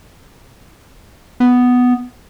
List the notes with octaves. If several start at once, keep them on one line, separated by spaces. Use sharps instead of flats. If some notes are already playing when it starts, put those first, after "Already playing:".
B3